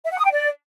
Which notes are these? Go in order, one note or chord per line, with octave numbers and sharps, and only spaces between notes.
E5
F#5
D#6
G5
D5